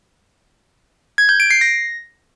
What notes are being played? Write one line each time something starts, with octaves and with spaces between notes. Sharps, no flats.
G#6
G6
D7
C7
A#6